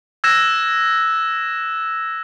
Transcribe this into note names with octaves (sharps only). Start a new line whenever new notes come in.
E6 F#6 G#6 A#6 E7